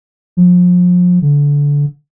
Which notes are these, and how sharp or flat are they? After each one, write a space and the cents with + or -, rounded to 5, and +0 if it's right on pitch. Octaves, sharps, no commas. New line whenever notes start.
F3 +35
D3 -25